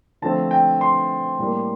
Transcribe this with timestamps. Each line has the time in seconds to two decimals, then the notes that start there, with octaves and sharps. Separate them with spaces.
0.22 D3 F3 A3 C4 A5
0.51 G5
0.81 C6
1.39 A2 G3 A#3